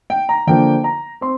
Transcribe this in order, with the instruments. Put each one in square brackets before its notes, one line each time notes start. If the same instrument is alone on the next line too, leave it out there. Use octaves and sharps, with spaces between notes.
[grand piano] G5
A#5
D3 F3 A#3 D4 G5
A#5
C4 C6